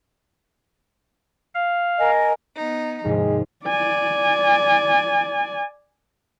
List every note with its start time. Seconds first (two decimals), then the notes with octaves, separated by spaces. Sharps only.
1.55 F5
1.98 A#4 D#5 G#5
2.57 B3 D#4
3.05 D#2 G#2 C3 F3 G#3
3.66 D5 G#5